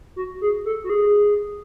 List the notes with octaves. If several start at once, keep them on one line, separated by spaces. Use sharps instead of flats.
F#4
G#4
A4
F#4
G#4